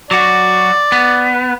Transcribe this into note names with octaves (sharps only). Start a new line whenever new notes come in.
F#3 F#4 D5
B3